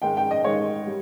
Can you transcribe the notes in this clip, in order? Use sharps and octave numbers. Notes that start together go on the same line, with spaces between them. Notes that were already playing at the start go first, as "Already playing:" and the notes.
G#2 D#3 G#3 G5
G5
D#5
G#2 D#3 G#3 C#5
G3